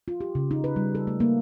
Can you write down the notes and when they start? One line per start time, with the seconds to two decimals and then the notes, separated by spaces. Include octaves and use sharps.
0.08 F4
0.21 G4
0.35 C#3
0.51 D#4
0.64 B4
0.76 G3
0.95 A4
1.07 A3
1.20 A#3